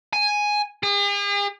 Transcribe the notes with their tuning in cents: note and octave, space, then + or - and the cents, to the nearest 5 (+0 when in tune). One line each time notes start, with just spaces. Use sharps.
G#5 +0
G#4 -45